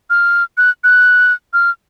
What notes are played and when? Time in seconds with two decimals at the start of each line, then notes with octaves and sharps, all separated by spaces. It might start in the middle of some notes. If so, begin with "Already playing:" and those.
0.10 F6
0.57 F#6
0.84 F#6
1.53 F6